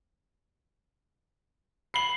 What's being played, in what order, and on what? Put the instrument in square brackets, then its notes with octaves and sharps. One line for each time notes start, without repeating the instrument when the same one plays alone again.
[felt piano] B5 [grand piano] C7 F#7